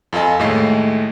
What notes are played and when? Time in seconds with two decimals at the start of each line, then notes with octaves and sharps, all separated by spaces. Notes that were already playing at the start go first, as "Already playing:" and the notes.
0.13 F2 F4 A4 D#5 G#5
0.39 D#2 A2 G#3 A3 D#5 C7